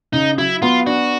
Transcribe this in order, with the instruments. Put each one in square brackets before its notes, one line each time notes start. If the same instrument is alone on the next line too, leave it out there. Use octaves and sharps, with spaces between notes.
[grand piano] C#3 [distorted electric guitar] D#4
[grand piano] F#3 [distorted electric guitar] E4
[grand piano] B3 [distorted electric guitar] F4
[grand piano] D4 [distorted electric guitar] F#4